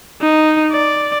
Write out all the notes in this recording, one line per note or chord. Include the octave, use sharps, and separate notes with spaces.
D#4
D5